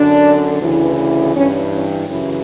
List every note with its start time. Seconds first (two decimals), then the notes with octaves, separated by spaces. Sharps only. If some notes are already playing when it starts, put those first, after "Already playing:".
Already playing: F#2 D3 D4
0.61 D2 C#3 E3
1.35 G2 E3 C#4
1.73 C#4
2.10 F#2 C#3 E3 E4